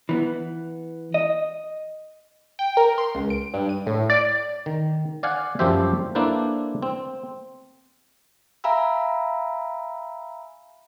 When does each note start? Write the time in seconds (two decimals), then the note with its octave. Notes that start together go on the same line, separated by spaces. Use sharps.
0.09 E3 B3
1.14 D#5
2.59 G5
2.77 A#4
2.98 C6
3.15 C#2
3.30 D7
3.54 G2
3.69 D#7
3.87 A2
4.10 D5
4.66 D#3
5.23 D5 F5 F#5 G#5
5.59 F#2 F3 G3 G4 C5 E5
6.15 A#3 D4 E4 A4 B4 C5
6.82 C4
8.64 E5 F5 G#5 A#5 B5 E6